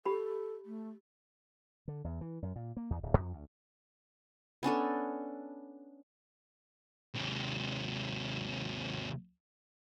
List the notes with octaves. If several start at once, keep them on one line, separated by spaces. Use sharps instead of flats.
G4 A4 B5
A3
D3
E2
E3
F#2
A#2
A#3
E2
D1
F2
D2
B3 C#4 D4 A4
D#2 C3